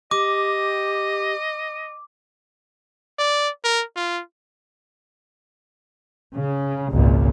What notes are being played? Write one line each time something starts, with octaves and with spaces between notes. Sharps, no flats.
G4 D#5 D6
D5
A#4
F4
C#3
G#1 C#2 A#2